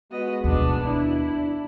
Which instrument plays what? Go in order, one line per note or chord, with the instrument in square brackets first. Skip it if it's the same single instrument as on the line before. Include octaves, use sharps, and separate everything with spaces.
[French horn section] G#3 F#4 [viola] B3 D#5
[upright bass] D#2 B2 [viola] B3 D4
[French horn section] D4 [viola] E4